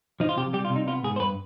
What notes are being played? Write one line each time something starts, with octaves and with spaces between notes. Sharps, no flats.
F3 D#4
F4
C3 G4
G3 G4
F4
C3
D#4
B3 F4
G#2 G#4
C5
G2 B4